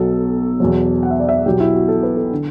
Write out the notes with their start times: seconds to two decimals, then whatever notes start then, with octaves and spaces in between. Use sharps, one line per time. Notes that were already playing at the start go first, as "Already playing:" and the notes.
Already playing: B1 B2 F#3 A4
0.60 E2 B2 F#3
1.03 F#5
1.11 E5
1.20 D5
1.29 E5
1.45 B1 B2 F#3 G4
1.60 E4
1.75 F#4
1.89 A4
2.03 B4
2.17 A4
2.33 D3